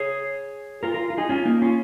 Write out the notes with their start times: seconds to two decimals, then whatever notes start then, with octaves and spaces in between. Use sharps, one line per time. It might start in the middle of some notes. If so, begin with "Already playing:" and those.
Already playing: G#4 C#5
0.83 F4 A#4
0.94 F4 A#4
1.10 F4
1.17 D#4 G#4
1.29 C#4 F4
1.45 A#3 D#4
1.62 C#4 F4